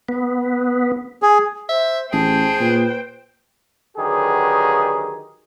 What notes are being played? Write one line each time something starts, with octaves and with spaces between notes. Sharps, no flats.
B3
G#4
C5 E5
A1 G#4 C5 G5 A5
A#2 B4
D3 D#3 F#3 G4 G#4 B4